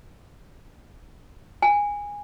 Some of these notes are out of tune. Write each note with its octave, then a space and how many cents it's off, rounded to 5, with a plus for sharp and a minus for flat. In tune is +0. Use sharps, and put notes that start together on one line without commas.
G#5 -15